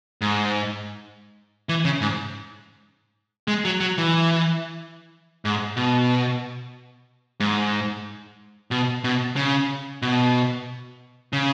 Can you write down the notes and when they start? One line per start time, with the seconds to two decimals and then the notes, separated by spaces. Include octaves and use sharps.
0.21 G#2
1.69 E3
1.85 C#3
2.01 G#2
3.48 G#3
3.65 F#3
3.80 F#3
3.98 E3
5.45 G#2
5.77 B2
7.40 G#2
8.71 B2
9.04 B2
9.36 C#3
10.02 B2
11.33 C#3